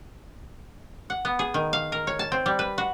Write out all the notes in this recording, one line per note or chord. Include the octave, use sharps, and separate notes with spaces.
F#5
B3
G#4
D#3
F5
A#4
C#5
A5
C4
G3
B4
F#4